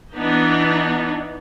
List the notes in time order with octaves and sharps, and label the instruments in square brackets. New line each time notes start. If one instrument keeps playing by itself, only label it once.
[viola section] E3 B3 D4 D#4